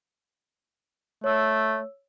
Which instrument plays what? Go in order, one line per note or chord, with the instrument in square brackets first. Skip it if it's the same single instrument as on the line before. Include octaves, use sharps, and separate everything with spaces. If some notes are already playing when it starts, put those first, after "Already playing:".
[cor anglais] A3 [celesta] C#5 E6